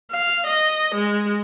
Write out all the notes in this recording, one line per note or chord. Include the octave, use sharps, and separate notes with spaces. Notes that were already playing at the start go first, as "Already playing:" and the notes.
F5
D#5
G#3